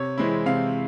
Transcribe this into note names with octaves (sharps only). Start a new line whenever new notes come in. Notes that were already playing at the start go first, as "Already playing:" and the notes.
Already playing: C3 C#5
E3 G#3 C4 E4
C3 F5